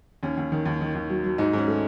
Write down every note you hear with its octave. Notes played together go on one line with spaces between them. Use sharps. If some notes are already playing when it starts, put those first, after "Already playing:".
D#2 C#4
D#2
D#3
D#2
D#3
D#2
F#3
F#3
G#2 D#4
G#2 C#4
A3